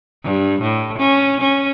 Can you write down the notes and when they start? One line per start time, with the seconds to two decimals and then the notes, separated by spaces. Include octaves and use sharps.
0.24 G2
0.61 A2
0.99 C#4
1.41 C#4